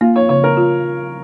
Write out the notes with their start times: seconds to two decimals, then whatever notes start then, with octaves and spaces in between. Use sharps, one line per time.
0.01 A#3 F4
0.16 C#5
0.29 C#3 C#5
0.44 A#4
0.57 F4